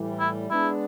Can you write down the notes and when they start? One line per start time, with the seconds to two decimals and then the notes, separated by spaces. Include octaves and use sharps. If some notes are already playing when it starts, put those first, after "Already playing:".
Already playing: A2 E3 G3
0.19 E4
0.50 G#3 B3 D4 E4